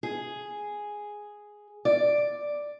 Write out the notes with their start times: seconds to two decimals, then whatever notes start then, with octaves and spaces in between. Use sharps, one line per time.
0.03 G#4
1.85 D5